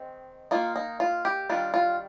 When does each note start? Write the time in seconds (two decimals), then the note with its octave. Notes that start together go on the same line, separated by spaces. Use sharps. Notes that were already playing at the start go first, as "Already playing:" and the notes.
Already playing: D#3 G#3 C4
0.51 D#3 A#3 D#4 F4
0.76 D#4
1.00 F4
1.25 G4
1.49 D#3 G3 D4 F4
1.74 F4